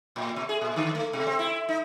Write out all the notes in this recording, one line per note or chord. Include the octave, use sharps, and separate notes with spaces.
A2
B2
G#4
A#2
D3
A3
B2
C4
E4
D#4